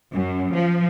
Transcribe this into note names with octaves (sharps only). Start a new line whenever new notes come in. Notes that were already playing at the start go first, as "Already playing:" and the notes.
F#2
F3